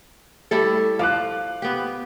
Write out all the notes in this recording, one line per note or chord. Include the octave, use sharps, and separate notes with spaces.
G3 A3 E4 A4
F3 F5 D6 F#6
B3 G4